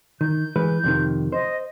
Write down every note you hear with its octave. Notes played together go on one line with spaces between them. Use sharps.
D#3 G6
E3 G#3 B4
F2 C3 D#3
C5 D#5